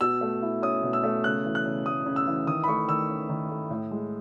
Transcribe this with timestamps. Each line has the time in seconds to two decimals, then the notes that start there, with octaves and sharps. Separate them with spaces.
0.01 B2 E6
0.21 A3
0.42 E4
0.62 C#4 D#6
0.83 B2
0.93 E6
1.03 A3
1.24 C#3 F#6
1.45 E3
1.55 F#6
1.65 C#3
1.86 A3 D#6
2.06 C#3
2.16 E6
2.27 E3
2.47 D#3 D#6
2.64 B5
2.67 A3 C#6
2.88 D#3 E6
3.09 C#4
3.29 D#3
3.50 A3
3.70 A2
3.91 G#3